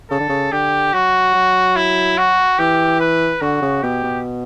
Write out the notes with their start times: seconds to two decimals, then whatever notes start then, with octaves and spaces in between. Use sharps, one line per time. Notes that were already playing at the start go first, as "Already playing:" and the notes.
0.11 C#3 A4
0.20 D3
0.29 C#3
0.52 D3 G4
0.93 F#3 F#4
1.34 F#3
1.76 E4
2.18 F#4
2.59 E3 G4
3.00 B4
3.41 D3 F#4
3.62 C#3
3.83 B2 G4
4.04 B2